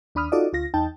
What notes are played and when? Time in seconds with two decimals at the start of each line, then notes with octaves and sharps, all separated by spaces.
0.15 D#2 D4 B5 D#6 F6
0.32 D#4 F4 F#4 A4 D5 D#5
0.53 D2 F4 A#6
0.74 E2 D#4 G5 A5